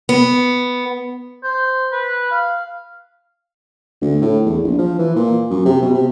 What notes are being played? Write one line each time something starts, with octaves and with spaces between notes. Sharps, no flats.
B3
C5
B4
F5
D2
A2
E2
A#1
F3
E3
A#2
F#2
C3
B2
C3